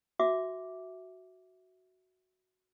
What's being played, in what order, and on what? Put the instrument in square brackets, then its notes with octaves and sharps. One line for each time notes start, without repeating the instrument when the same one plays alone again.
[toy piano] F#4 E5 D6